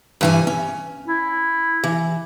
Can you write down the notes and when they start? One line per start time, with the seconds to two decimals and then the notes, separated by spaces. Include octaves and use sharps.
0.21 G2 E3 G#5
0.47 C#4
1.08 E4
1.84 E3